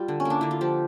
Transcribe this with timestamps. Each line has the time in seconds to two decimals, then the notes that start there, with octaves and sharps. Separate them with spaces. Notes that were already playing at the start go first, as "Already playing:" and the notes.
Already playing: G3 F4
0.08 D3
0.20 C#4
0.25 A#3 D4
0.41 D3 E4
0.51 F4
0.61 F3 G4